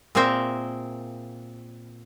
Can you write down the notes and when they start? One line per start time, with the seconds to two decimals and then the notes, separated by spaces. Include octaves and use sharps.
0.15 A#2 C4 G#4 A#4 C5 E5